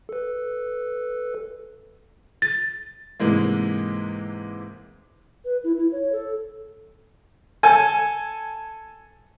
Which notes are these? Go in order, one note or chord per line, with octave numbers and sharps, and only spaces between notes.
A4 B4
A6
G#2 C3 E3 G#3 A#3
B4
E4
E4
C#5
A4
A4 G#5